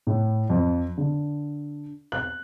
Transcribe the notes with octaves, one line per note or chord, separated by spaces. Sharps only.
A2
F2
D3
F#6